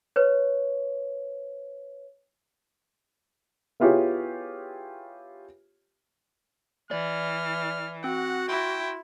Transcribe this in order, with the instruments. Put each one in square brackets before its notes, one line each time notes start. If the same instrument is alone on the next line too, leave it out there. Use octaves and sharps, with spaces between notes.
[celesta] B4 C#5
[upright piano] B3 E4 F4 G4 G#4 C#5
[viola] E3 [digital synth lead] D5 [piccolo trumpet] F6
[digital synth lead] C4 [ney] F#4 [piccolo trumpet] F#5
[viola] E4 [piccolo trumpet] G5 [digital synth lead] C6